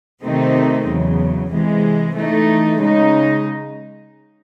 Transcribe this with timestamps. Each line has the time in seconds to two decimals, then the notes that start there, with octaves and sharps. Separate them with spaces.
0.23 C3 D#3 A3 C4 D#4
0.86 E2 C#3 F#3
1.51 C3 E3 G#3
2.16 E3 A3 D#4
2.80 C#3 G#3 D#4